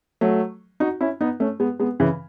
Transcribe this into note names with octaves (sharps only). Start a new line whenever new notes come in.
F#3 A3
D#4 F#4
C#4 E4
B3 D#4
A3 C#4
G#3 B3
G#3 B3
C#3 E3